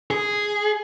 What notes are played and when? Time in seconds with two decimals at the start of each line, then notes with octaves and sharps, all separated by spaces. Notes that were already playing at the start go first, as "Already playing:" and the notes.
0.11 G#4